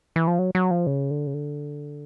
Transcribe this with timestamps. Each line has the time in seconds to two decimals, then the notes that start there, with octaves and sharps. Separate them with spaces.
0.16 E3
0.28 F3
0.39 F#3
0.55 F#3
0.71 F3
0.87 C#3
1.11 D3
1.27 C#3
1.34 D3